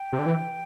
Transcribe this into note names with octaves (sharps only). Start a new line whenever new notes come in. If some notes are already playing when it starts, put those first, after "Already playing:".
Already playing: G5
C3
D3
E3